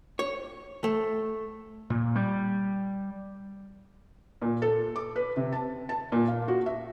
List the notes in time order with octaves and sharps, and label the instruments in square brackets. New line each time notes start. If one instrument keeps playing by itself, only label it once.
[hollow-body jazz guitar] C#5
A3
[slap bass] A#2
G3
[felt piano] A#2
A4
D6
B4
C3
A5
A5
A#2
F5
F#4
E5